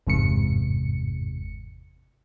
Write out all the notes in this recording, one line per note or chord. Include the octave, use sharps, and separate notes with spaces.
G1 E2 G#2 C3 C#7